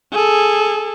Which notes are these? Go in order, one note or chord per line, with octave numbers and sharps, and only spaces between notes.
G#4 A4